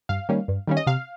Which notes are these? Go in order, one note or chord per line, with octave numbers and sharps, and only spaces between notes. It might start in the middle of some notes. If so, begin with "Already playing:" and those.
G2 F5
D#3 G3 A#3 C#4
G2
D#3 G3 A#3 C#4
D#5
C3 F5